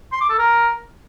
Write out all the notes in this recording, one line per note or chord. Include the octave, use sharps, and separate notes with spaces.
C6
D6
A4
A#4